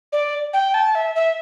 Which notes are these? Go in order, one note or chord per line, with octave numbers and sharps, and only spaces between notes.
D5
G5
A5
E5
E5